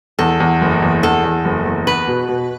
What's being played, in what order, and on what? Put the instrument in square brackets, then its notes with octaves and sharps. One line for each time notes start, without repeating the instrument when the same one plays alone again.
[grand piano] E2 [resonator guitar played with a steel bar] A4
[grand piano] E2
F#1
E2
[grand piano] E2 [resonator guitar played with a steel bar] A4
[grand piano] E2
F#1
E2
[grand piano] B3 [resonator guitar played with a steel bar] B4
[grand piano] B2
B2